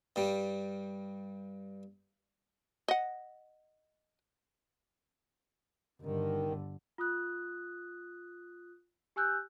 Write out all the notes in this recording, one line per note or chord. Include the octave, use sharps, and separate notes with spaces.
G2 G3
D#5 F#5
G1 D3 D#3
F4 D#6 F#6
G4 G#5 E6 F#6 G6